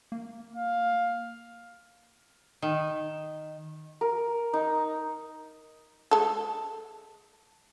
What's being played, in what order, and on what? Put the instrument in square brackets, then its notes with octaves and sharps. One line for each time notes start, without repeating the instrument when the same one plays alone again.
[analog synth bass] A#3
[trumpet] F5
[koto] D#3
[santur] A#4
D#4
[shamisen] G#3 A4